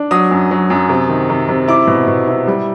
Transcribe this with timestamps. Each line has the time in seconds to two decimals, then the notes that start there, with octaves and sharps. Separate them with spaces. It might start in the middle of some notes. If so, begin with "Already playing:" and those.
Already playing: D4
0.11 F#3 D#6
0.31 F#2
0.51 F#3
0.70 F#2
0.89 C3
1.09 D#3
1.30 C3
1.48 C3
1.68 E4 D6
1.87 B2
2.07 B2
2.27 E4
2.47 G3